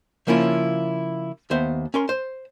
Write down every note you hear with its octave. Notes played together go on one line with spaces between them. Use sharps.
C#3 F3 A#3 C#4 E4 F4
D#2 B3 C5 E5
C#4 A#4 C6
C5